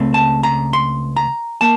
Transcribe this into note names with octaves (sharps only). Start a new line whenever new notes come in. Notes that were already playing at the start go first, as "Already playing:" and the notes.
Already playing: C#2 C#3 A3 C4
A5
A#5
C6
A#5
A#3 A5